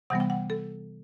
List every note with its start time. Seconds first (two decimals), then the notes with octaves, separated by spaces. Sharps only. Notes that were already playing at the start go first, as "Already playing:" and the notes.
0.10 C3 E3 G3 B3 F#5
0.20 G5
0.30 F#5
0.50 A4